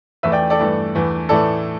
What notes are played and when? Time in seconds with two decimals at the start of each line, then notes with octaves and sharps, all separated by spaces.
0.23 E2 E3 A3 B4 E5
0.32 D5 G5
0.50 A4 D5
0.59 G2 E3 A3
0.95 E2 E3 A3
1.29 A2 E3 A3 A4 D5